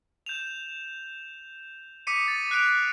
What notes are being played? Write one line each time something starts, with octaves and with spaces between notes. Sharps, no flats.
G6 E7 F7
D6 D#6 B6 C#7 D#7
A6
F#6 C7 D7 D#7 F7